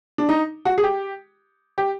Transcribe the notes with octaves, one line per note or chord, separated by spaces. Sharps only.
D4
D#4
F#4
G#4
G4
G4